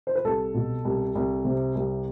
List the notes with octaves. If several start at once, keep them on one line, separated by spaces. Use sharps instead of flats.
C5
B4
C2 A4
B2
C2
C2
C3
C2